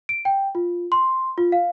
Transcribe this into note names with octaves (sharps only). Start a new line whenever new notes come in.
D7
G5
F4
C6
F4
F5